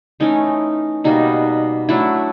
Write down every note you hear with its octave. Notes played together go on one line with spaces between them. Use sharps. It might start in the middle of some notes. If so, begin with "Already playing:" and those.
E3 A3 C#4 D#4
B2 G3 A#3 D#4
F#3 A3 D4 E4